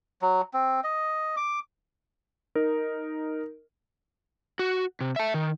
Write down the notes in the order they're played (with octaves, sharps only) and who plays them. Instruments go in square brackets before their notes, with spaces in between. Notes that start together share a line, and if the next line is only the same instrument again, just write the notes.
[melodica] F#3
C4
D#5
D6
[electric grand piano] D#4 A#4
[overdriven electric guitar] F#4
C3
E5 A5
D#3